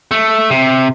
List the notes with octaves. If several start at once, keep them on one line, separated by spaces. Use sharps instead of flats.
A3
C3